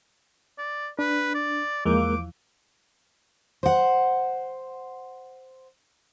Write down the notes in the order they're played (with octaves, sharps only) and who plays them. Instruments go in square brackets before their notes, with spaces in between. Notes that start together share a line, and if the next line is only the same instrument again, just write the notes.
[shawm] D5
[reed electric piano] D4 [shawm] B4
[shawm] D5
[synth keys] E2 F3 [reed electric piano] G#3 A#3 A#4 [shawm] D6
[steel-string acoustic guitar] C5 F#5